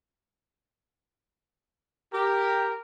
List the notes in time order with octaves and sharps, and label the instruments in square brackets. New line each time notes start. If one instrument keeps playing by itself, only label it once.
[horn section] G4 [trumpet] A#4